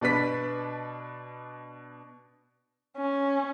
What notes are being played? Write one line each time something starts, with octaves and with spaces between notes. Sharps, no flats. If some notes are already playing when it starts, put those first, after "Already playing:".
B2 D4 B4 B6
C#4